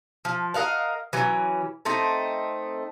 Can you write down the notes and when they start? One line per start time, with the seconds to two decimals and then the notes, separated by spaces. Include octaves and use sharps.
0.25 F3
0.54 A#4 D#5 F5 F#5
1.13 E3 F#3 C#4
1.85 A3 C4 D#4